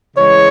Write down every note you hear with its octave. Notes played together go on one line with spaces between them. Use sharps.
C#3 E3 G#3 C#5